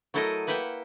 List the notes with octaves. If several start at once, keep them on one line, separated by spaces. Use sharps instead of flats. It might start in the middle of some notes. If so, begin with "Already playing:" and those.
F#3 A3 E4 A4 A#4 D#5
A#3 B4 E5 F#5 G5